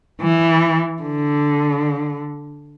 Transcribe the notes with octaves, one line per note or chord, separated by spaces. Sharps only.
E3
D3